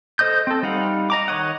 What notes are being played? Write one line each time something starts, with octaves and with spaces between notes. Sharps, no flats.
A4 C5 D#5 D#6 G6
C4 A4
G3 D#4 F5 F#5
D#5 A#5 D6
D#3 C#5 D#5 F#5